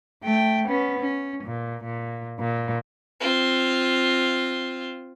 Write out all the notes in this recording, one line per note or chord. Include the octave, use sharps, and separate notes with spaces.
A3 G5
B3 C#4
C#4
A#2
A#2
A#2
C4 F4